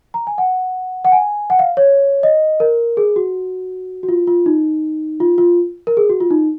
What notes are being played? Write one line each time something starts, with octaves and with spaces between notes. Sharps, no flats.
A#5
G#5
F#5
F#5
G#5
F#5
F5
C#5
D#5
A#4
G#4
F#4
F#4
F4
F4
D#4
F4
F4
A#4
G#4
F#4
F4
D#4